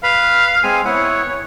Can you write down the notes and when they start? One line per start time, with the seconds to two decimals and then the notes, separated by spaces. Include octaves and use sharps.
0.03 B4 F5 B5
0.63 G#3 C4 G#5
0.85 B3 E4 C#5 F#5